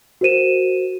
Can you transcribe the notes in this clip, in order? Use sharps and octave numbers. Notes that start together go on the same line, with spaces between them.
F#4 A#4 C5 D#7 E7